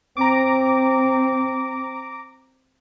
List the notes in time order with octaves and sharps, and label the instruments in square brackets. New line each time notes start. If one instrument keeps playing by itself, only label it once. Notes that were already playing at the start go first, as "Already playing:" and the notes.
[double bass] C4 [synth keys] A#5 D6